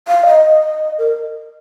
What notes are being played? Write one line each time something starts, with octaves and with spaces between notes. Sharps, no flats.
F5
D#5
A#4